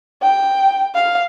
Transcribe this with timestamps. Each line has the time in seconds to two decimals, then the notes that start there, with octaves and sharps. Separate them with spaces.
0.22 G5
0.95 F5